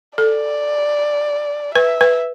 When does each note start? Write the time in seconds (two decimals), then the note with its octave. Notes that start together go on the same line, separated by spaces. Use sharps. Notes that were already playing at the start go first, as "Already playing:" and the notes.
0.18 A4 D5
1.75 B4 E5
2.01 B4